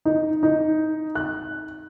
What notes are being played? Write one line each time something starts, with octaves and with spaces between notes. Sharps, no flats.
D#4
D#4
F#6